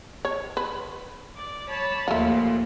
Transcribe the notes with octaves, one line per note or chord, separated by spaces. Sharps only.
C#5
B4
D5
C#5 A5 B5
D#2 A#2 F3 A3 F4